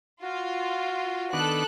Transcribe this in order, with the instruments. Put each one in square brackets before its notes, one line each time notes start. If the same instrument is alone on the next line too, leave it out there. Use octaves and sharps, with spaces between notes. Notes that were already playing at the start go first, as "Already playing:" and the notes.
[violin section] F4 [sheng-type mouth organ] F#4
[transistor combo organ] D#3 B3 D4 [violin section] A4 F#6